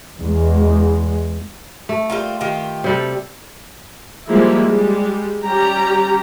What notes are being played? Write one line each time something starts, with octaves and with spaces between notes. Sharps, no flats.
E2 G#3
A3
G3 A#3 F4
D#3 F4 G4
C3 G3 A4
F3 G3 G#3 A#3 E4
G3 G#3
G3 C#4 G4 A#5